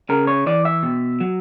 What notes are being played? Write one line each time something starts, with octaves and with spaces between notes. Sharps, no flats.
C#3 A#4
C#5
E3 D5
E5
B2
F#3